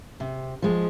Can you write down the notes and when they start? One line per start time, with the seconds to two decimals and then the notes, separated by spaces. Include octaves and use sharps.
0.20 C3
0.62 F3 G#3